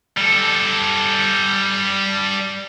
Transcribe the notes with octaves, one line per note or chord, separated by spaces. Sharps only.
G3 A4